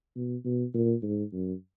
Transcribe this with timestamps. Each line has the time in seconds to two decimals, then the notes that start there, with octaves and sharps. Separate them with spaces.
0.16 B2
0.45 B2
0.74 A#2
1.03 G#2
1.32 F#2